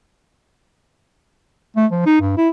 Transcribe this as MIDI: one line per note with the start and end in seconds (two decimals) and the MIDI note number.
1.76 1.86 57
1.91 2.01 53
2.06 2.20 63
2.21 2.35 43
2.37 2.49 64